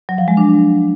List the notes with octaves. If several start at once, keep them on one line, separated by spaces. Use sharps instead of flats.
F#3
F3
G#3
D4